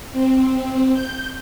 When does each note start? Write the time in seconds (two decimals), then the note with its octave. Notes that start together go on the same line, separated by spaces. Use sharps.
0.13 C4
0.93 G6